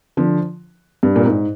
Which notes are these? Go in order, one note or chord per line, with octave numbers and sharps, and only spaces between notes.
D3 F3
G2
A#2
G#2